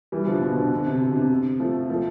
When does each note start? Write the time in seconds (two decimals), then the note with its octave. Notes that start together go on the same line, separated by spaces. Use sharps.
0.12 E3 G3
0.27 D3 F3
0.42 B2 D3
0.57 B2 D3
0.75 D3
0.86 C3
1.01 B2
1.11 D3
1.16 C3
1.60 F3 A3
1.89 F3 A3